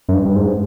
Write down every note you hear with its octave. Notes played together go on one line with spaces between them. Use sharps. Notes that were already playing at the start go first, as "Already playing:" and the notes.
F#2
G2
G2
G#2